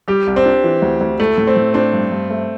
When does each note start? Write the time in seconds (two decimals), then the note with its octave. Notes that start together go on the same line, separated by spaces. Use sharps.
0.08 G3 G4
0.27 C2
0.36 C4
0.46 D4
0.64 E3
0.82 D2
1.01 D2
1.19 A3 E4
1.38 A2
1.47 C4
1.57 A2
1.74 C4 D4
1.93 G2
2.12 G2
2.30 A3